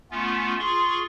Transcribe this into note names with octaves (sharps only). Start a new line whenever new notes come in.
A3 B3 C#4 F4
F4 G#4 C6 C#6